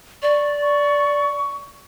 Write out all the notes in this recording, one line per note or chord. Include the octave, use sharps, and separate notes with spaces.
D5 C#6
C#6